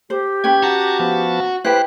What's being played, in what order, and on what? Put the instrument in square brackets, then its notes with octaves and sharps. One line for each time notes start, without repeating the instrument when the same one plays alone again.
[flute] G4 [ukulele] C5
[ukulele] C#4 B4 G5 [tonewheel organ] G#6
[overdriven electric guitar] F#4 [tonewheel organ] A5 A#5
[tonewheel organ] F3 B3 A5
[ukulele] E4 G4 G5 [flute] B4 [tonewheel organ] C5 F#6